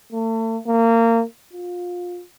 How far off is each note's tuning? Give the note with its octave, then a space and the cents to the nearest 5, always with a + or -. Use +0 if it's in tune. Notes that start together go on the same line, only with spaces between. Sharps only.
A3 +40
A#3 -25
F4 +25